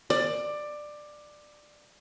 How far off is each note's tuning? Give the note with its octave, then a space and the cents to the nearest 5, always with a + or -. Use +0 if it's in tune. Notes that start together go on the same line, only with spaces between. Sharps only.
D5 +15